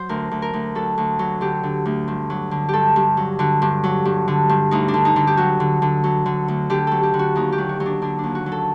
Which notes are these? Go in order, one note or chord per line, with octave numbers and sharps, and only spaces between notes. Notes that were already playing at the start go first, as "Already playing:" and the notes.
Already playing: F#3 C5
D2 A#4
D2
A#4
D2
F#3 A4
D2
F#3
D3 G4
D3
D2
G2
F#3
D3
G2 G4 A4
G2
F#3
D3 F#4
G2
F#3
G2
D3
G2
D2 D#4
D4
D3
D#4
D3
G4
F#3 F#4
D3
D3
F#3
D3
D2
D3 G4
F#3 A4
G4
D3
F#4
D#2 D#4
G4
F#3
F#4
F#3
D4
D3 D4
D#2 D4
F#4
F#3
A4